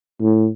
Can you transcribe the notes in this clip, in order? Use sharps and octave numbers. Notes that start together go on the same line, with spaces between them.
A2